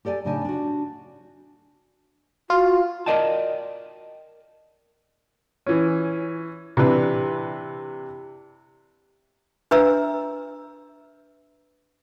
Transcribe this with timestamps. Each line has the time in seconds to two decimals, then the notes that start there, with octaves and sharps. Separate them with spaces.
0.05 G4 A4 D5 G5 G#5
0.25 A2 C#3 D4 D#4 G#5 A5
0.45 D4 F#4
2.50 F4 F#4
3.06 A#4 C5 D5 D#5 G5 A5
5.66 E3 C#4
6.77 C3 E3 D4 B4
9.71 D4 B4 E5 A#5 E6